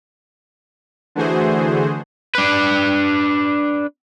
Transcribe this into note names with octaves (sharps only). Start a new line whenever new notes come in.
D3 E3 A3 F#4 G#4 C5
D4 B4